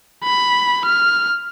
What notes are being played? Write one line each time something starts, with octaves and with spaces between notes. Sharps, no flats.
B5
F6